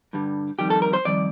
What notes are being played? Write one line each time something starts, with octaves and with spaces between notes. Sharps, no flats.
G2 D3 G3
F2 D#3 G3 G4
A4
A#4
C5
F2 D#3 G3 D5